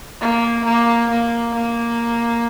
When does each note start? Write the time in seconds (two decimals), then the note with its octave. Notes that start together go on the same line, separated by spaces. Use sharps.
0.21 A#3
0.65 A#3
1.10 A#3
1.54 A#3